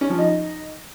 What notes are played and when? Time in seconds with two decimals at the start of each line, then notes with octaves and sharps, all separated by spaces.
0.01 C#4
0.10 F3
0.18 D#4